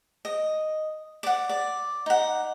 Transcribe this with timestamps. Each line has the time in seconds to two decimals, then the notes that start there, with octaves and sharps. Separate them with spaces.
0.25 D#5
1.23 D5 F#5
1.49 D5
2.06 D#4 F#5